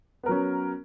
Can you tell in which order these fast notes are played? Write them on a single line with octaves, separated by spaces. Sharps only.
B3 A#4 F#3 C#4